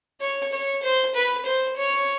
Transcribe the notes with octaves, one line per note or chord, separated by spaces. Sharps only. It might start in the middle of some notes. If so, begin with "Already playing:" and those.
C#5
C#5
C5
B4
C5
C#5